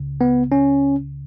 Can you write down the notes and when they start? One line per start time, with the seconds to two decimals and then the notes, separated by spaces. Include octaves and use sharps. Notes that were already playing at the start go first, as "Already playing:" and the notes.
Already playing: C#2 C#3
0.21 B3
0.52 C#4